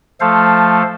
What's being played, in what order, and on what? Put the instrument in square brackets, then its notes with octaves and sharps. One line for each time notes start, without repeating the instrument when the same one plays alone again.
[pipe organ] F3 A3 A4 C5 F5